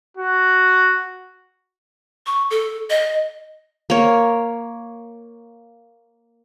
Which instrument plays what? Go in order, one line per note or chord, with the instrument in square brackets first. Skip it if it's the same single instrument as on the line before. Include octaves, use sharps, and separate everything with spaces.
[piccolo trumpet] F#4
[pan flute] C#6
A4
D#5
[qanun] A#3 C#5